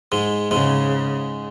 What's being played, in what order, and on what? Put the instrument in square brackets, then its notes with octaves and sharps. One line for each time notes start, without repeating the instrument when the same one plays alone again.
[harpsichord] G#2 G#3
[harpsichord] G#2 G#3 [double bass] C#3